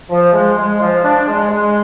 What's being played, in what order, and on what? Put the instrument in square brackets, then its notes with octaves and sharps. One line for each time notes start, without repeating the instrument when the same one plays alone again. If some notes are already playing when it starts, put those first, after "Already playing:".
[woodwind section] F3
G#3
G#3
F3
D4
G#3
G#3